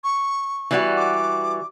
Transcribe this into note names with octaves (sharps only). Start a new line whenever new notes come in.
C#6
E3 G3 F#4
D6